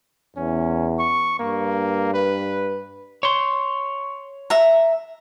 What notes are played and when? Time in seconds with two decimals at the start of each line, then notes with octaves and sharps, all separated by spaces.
0.36 E2 C#4
0.99 C#6
1.39 G2 A#3
2.14 B4
3.23 C#5 C6
4.50 E5 A#5